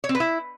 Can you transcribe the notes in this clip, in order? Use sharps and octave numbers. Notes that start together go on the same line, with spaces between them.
C#5
C4
B4
E4